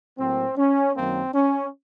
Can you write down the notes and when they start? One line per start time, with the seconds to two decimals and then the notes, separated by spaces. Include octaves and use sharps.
0.18 A2 F#3 A#3 C4
0.57 C#4
0.95 F#2 D#3 F#3 A#3 C4
1.33 C#4